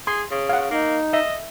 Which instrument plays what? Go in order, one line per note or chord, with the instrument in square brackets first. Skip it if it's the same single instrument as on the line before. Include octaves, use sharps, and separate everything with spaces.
[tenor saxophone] G#4 [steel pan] C6
[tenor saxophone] C#3
[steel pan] F5 F#5
[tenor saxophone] A#3 [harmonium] D#4
[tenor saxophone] D#5 [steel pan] E5